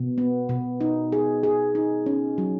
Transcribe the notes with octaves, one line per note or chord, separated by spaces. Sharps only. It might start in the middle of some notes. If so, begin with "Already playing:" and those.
Already playing: B2
B3
B2
D#4
G#4
G#4
D#4
C#4
F#3